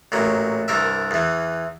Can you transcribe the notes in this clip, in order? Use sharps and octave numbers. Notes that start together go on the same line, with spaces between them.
A1 A#2 F#3
C2 G2 A#4 E5
E2 E3